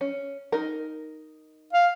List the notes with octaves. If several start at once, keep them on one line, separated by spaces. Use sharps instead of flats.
C#4
D#4 A#4
F5